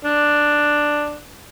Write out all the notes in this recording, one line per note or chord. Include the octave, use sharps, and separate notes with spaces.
D4